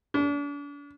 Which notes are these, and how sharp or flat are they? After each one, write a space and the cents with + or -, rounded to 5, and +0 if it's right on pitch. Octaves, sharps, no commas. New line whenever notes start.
D4 -40